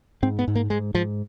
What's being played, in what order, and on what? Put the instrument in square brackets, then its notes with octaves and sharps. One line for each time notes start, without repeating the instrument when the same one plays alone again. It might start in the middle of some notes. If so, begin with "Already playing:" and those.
[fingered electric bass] G#2 C4
B3
G#2
A#3
G#2 G#3
G#2 F3